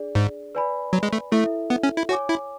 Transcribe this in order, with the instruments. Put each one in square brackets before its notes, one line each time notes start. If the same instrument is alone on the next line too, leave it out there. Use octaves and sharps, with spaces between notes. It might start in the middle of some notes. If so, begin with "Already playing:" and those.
Already playing: [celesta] D4 G#4 D5
[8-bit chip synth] G#2
[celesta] B4 D5 G#5 B5
[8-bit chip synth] F#3
G#3
A3
[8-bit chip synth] A3 [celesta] E4 A4 E5
[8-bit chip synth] B3
C#4
E4
[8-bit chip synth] F#4 [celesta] C#5 G#5 D6
[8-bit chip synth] E4